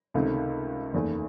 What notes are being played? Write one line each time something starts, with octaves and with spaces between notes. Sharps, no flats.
C#2 C3 D#3 A3
F#1 E2 D#3 A3